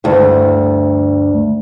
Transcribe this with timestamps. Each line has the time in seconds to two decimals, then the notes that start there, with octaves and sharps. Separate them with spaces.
0.04 D2 G2